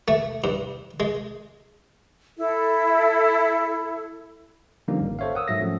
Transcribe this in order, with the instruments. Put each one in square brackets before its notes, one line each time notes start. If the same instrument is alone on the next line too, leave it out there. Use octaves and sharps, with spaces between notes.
[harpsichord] A3
G2
G#3
[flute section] E4 A4
[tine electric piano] D3 F3 G3 A#3 C#4 D#4
G#1
A4 C5 C#5 E5 F5
A#4 F#5 D#6 E6
G#2 F#3 E5 A#6
F3 A3 C#4